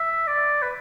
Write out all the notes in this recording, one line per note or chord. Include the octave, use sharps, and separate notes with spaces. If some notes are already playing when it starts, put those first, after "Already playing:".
Already playing: E5
D5
B4